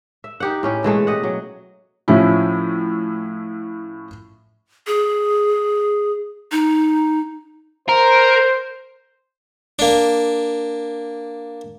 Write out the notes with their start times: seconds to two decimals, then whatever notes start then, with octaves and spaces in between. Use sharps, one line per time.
0.24 E5
0.40 D#4 G4 F#5
0.63 A2 C#4 G4
0.83 B2 E3 G#3 A3
1.07 G4 D#5 F#5
1.23 F#3
2.08 A2 F3 C#4 E4
4.87 G#4
6.52 D#4
7.89 A#4 C5
9.79 A#3 D4